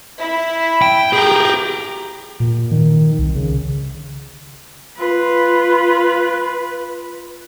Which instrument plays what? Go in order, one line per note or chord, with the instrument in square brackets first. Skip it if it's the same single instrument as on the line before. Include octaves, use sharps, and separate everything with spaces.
[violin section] E4
[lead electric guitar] G5
[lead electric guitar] G4 G#4 [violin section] G5 A#5
[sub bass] A#2
D#3
C2
C#3
[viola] F4 B4